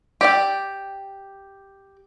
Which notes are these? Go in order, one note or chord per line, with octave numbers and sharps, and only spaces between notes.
G4 D5 G5